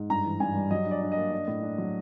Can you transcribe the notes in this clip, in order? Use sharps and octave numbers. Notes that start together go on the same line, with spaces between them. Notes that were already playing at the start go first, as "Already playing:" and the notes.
Already playing: G#2
G2 A#5
E3
G2 G#5
G3
F#3 D#5
D4
D5
D4
D#5
A#3
D4
A2
D4
F#3